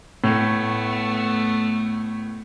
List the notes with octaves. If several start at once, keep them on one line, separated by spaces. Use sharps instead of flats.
A2 A3 B3